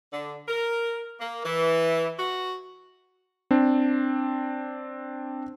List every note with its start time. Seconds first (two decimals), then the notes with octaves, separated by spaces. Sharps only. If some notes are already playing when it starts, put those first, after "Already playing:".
0.11 D3
0.46 A#4
1.20 A#3
1.44 E3
2.18 F#4
3.51 C4 D4